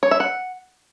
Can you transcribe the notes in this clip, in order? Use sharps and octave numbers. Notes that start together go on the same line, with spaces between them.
C#5
E5
F#5